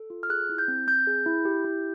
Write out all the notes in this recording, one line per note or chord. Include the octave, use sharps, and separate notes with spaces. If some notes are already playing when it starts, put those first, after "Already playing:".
Already playing: A4
F4
F6
G#4 F#6
E4
G6
C4
C4 G6
G#4
E4
G4
E4